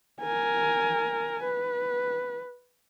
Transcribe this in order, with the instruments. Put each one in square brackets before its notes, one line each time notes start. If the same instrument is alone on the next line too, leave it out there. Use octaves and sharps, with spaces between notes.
[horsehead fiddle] A#4 G#5
B4